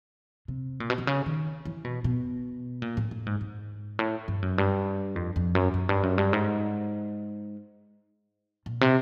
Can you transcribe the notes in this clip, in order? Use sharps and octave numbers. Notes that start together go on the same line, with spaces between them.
C3
A#2
B2
C3
C#3
D#3
E3
B2
B2
A#2
A2
A2
G#2
G#2
A2
G2
F#2
G2
F2
F2
F#2
F#2
G2
F#2
G2
G#2
A#2
C3